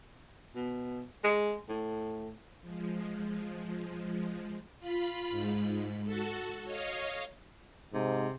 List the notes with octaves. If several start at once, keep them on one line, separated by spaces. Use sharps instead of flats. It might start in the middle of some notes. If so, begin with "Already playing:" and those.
B2
G#3
A2
F3 G#3
F4 B5 B6
G#2
F#4 A4
C#5 D#5 F5
G#2 C3